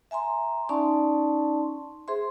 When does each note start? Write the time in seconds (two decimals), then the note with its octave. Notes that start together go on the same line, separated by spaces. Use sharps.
0.11 E5 G#5 A#5 C6
0.69 C#4 D#4 D5 A5 C6 C#6
2.08 G#4 C5 E5 C6